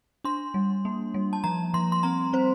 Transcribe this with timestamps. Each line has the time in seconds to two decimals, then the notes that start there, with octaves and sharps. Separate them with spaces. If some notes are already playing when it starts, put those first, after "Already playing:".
0.24 D4 C6
0.54 G3
0.85 A#3
1.14 G3
1.33 A5
1.44 F3 A#5
1.74 F3 C6
1.92 C6
2.03 C4 A#5
2.33 C4 C5